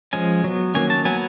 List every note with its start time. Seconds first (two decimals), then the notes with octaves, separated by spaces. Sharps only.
0.13 F3 G#3 C#4 G#5
0.44 F#3 B3
0.74 D#3 F#3 A#3 C#4 G#5
0.90 A5
1.05 F#3 B3 G#5